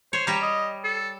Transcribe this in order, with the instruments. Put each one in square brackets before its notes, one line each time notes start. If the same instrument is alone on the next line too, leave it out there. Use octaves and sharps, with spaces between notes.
[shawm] C5 [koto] C#5
[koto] G3 G4 [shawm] A#5
[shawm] D#5
A4